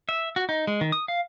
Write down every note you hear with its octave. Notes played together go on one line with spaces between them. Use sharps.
E5
F#4
D#4
G#3
D#3
D#6
F5